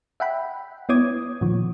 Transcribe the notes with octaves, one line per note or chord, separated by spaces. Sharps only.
E5 F#5 G5 B5
B3 E4 C#5 D6 D#6 G#6
A#2 D#3 F3